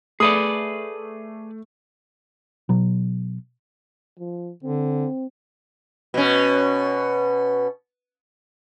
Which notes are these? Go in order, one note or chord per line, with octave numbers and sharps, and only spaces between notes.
A3 G#4 B4 D5 D#6
B2 F#3
F3
D3 C4
B2 C#4